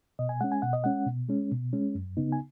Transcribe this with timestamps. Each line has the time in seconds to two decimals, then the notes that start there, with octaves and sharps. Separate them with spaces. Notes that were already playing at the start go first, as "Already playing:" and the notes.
0.19 B2 D#5
0.29 G#5
0.41 G#3 C#4 F#5
0.52 G#5
0.62 B2 F#5
0.73 D#5
0.84 G#3 C#4 F#5
1.06 B2
1.29 G#3 C#4
1.51 B2
1.73 G#3 C#4
1.95 F#2
2.17 C#3 B3 D#4
2.32 G#5